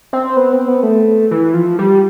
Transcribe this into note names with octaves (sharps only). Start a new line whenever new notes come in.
C4
B3
C4
B3
A3
E3
F3
G3